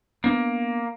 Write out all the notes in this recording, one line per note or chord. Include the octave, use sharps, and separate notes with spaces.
A#3 B3 D4